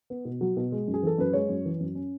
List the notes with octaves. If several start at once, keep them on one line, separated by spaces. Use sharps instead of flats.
B3
B2
F#3
B2
G#3
F#2
G#4
E3 A4
F#2 B4
G#3 C#5
F#2
E3
F#2
C#4